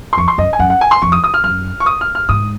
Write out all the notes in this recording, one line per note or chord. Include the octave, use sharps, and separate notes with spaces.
C6
F2 C#6
C6
F#2 D#5
G#5
F#2 F#5
F#5
G#5
C6
F2 C#6
D#6
D#6
F6
F#2 F6
C#6
D#6
F6
F6
G#2 D#6